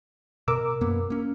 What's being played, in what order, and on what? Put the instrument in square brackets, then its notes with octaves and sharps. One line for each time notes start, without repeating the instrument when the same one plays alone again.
[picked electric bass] B2 [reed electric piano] A#4 D6 E6
[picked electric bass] F#2 A#3 B3
A#3 C#4